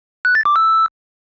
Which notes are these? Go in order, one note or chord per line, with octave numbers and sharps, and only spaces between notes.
F#6
A6
D6
E6